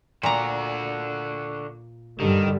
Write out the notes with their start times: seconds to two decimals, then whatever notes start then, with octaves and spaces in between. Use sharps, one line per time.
0.23 A#2 D3 F#4 A#5
2.20 G2 D3 D#3 G3